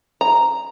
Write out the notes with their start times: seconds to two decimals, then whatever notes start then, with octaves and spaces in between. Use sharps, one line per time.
0.21 A#5